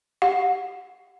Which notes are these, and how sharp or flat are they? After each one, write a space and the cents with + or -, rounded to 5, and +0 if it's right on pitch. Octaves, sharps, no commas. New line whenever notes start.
G4 +0 F#5 -30